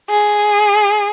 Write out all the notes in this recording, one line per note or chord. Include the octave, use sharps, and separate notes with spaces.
G#4